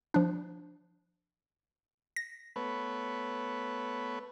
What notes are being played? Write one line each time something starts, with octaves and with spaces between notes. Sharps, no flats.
F3 D4
A#6
A3 B3 B4 C#5